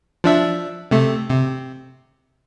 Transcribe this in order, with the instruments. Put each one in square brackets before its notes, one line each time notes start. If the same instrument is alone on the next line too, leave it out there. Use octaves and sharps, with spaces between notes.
[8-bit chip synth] F3 D4 E5
C3 A3
C3